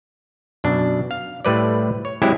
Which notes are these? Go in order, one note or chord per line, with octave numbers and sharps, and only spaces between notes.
F#2 B2 D4
F5
A2 G3 A3 B4 C5 D5
C#5
F#3 G#3 C4 E4 G4 G#4